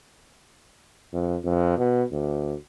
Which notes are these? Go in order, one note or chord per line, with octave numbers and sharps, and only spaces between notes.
F2
F2
B2
D2